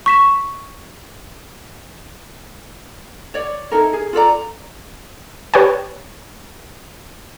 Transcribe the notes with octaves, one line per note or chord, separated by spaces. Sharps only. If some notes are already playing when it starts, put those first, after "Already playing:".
C#6 B6 E7
C#5 D5
D#4 E4 A4 A#4
G#4
F4 A4 D5 A#5
G4 B4 C#5 D5 G5 G#5